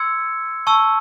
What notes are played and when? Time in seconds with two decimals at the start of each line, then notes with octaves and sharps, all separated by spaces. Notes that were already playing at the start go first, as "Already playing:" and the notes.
Already playing: C6 E6 G#6 C#7
0.67 A5 C#6 E6